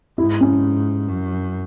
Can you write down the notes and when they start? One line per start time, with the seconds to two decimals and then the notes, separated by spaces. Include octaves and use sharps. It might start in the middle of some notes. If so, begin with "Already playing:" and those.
0.18 G#2 E4
0.41 C#4
1.08 F#2